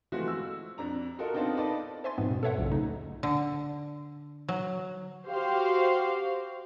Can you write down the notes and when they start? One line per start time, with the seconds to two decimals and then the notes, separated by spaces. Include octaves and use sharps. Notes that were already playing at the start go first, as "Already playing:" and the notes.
0.12 E3 F3 G#3 A3 F4 F#4
0.28 E6
0.78 F2 D4 A#5
1.19 F4 F#4 A4 A#4 D#5
1.34 B3 C4 D4 D#4 F4 A5
1.57 D#4 A4 B4 D5 A5
2.04 C5 E5 G#5 C6 A6
2.18 G#2 B2 F3 B3 C4
2.31 G2 B2
2.43 A4 B4 C#5 E5 F#5
2.58 B1 F#2 A#2 C#3
2.72 D2 D#4
3.23 D3
4.48 F#3
5.27 F#4 G4 C5 F5